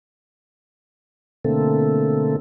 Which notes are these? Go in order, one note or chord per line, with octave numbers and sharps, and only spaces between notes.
B2 D3 A3 A#3 C4 A4